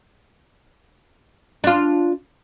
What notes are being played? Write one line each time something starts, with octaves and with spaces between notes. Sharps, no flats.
D4 F4